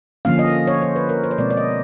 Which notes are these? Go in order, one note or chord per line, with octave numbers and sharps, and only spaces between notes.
D3 F3 A#3 C#4 F5
D#5
C#5
C5
B4
A#4
C5
C#5
B2 G#3 C4 D5
D5
D#5